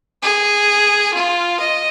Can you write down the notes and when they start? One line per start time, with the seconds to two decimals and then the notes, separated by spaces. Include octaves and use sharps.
0.23 G#4
1.14 F4
1.60 D#5